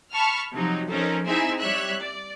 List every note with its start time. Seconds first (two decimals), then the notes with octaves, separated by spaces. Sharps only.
0.13 A5 B5 C#6 F6
0.53 C3 F3 F#3 D#4
0.89 F3 C#4 D#4 A4 A#4 C5
1.24 C4 D#4 E4 G#4 E5 G#5
1.59 G3 C#5 E5 F#6
2.01 D5